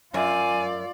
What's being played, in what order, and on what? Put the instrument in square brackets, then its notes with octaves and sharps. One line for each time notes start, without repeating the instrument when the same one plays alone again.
[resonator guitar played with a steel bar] F#2 [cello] F4 D5 [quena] G#5